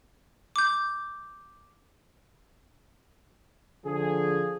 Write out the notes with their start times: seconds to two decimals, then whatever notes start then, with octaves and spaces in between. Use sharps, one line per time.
0.56 D6 G6
3.86 D3 F3 G#4